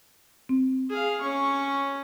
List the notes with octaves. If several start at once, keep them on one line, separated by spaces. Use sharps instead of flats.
C4
G#4 F5
C#4 C#6